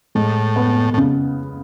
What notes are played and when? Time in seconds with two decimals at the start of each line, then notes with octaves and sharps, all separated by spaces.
0.15 A2 G#3
0.56 B3
0.94 A2
0.98 C#3